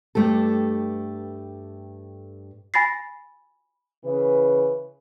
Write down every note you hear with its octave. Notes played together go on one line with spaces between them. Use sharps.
G2 A3 G4 A4
G#5 B5 A6 A#6 C7
C#3 E3 B4